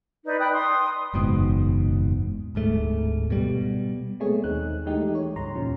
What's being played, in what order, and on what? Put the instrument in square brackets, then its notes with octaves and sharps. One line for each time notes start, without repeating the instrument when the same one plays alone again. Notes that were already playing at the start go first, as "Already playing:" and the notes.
[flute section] D#4 B4 D5
G5 B5 D#6 F#6
C6 D#6
[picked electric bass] F#1 E2 G#2 B2
D1 G#2 A3
B2 G3
[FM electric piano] G#3 A3 B3 C4 G#4 C#5
D#2 C4 D#4 F#6
E3 G#3 A3 D#4 G4
C#5
C#2 G2 A#5 C6
E2 A#2 F3 C#4